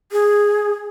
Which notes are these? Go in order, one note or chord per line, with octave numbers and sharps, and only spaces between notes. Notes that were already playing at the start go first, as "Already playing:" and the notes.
G#4